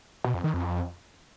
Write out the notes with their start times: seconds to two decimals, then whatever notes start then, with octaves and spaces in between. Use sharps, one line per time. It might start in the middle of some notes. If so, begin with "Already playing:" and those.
0.24 B2
0.34 F2
0.44 D#3
0.54 F2